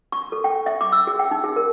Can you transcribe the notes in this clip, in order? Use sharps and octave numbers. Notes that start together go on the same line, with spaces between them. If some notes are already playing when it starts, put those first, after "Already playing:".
C#6
A4
G5
E5
D6
E6
G#4
G5
D#4
G#4
A#4